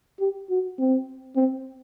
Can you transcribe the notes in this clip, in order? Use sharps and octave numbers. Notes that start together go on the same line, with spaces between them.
G4
F#4
C4
C4